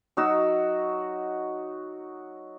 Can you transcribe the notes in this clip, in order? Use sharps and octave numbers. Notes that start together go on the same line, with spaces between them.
F#3 D#4 F#4 E6